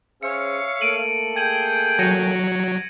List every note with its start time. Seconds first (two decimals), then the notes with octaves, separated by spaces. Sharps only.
0.23 C#4 G#4 C5 C#5 E5 F5 C#7
0.81 A3 A#3 A4 D7 D#7 F#7
1.36 G#4 G5 G#6 D#7 F#7
1.99 F#3 A#6 C#7 D#7